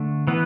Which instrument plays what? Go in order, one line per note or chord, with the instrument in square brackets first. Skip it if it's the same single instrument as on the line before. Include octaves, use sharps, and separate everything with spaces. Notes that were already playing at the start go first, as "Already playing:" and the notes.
Already playing: [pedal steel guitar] D3 A3
E3 B3